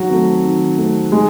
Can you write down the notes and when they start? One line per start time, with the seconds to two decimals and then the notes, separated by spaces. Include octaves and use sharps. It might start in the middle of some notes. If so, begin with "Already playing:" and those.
Already playing: D#3 F#3 F#4
0.10 A3 C4
0.44 D#3
0.78 A3 C4
1.11 D#3 G#3 G#4